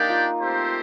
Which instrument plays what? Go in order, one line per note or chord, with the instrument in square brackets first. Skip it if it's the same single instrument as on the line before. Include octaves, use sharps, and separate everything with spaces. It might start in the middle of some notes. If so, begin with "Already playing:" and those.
Already playing: [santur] A#3 D#4 [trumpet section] D4 G4 D5 G5
[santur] F4
[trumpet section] A3 C4 G4 C5